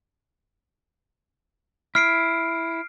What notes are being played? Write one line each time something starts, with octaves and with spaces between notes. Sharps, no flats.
E4 F6 C7 D7